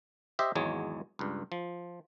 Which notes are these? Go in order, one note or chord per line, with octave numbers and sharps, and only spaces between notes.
G4 C5 D#5 E5
G#1 E2 F#3 G#3 C#5
C#2 G2
F3